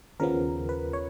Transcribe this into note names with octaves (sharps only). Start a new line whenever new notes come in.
D#2 C#3 F3 B3 A#4
B4
C#5